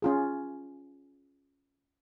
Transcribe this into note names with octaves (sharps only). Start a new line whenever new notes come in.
C#4 F4 G#4